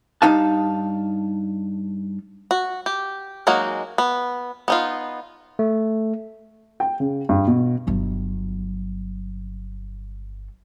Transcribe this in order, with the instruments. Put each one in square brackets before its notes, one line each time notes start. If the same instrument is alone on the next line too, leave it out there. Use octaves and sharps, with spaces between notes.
[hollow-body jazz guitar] G2 D#4 F5 A5
[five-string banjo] F#4
G4
F#3 G#3 A#3 D#4 F#4
B3
B3 D#4 F4
[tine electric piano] A3
[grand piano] G5
C#3
G2
B2
[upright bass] G1 F#3